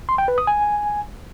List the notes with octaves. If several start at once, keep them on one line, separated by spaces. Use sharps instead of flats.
C6
G5
B4
D#6
G#5